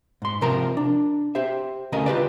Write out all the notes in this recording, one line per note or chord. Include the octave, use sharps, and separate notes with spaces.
G#2 C6
C3 F3 A#4 A#5
D4
G4 C5 E5
D2 C#3 A3 A#4 D#5
F4 G4 B4 D5